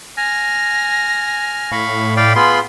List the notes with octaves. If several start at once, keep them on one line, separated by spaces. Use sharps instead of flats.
G#5 F6 A#6
A2 F5 B5 C#6
D5 F5 G5 B5
B3 F4 G#4 B5 C6